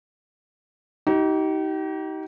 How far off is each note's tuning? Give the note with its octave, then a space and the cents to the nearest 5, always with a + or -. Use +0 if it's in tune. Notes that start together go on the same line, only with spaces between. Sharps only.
D#4 +25 G4 -35